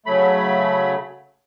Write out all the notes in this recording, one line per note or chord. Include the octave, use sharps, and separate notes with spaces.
C#3 F#3 A3 B5